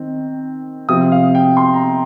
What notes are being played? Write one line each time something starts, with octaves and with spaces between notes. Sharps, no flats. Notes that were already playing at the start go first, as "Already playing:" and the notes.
Already playing: D#3 C4
C3 F3 C4 D#6
F5
G5
C6
A#5